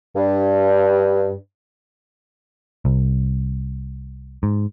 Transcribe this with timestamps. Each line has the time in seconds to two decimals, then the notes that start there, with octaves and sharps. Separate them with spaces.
0.16 G2
2.85 C2
4.43 G#2